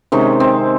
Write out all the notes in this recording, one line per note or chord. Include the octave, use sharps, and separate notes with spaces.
C3 D#3 G#3 C#4
C4